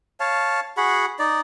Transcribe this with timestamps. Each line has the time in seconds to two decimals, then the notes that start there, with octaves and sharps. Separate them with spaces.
0.20 C#5 F5 A5
0.77 F#4 G#4 F#5 B5
1.19 D#4 D5